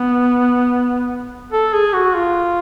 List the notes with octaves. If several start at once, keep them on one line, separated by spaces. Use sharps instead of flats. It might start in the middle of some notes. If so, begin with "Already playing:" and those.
Already playing: B3
A4
G#4
F#4
F4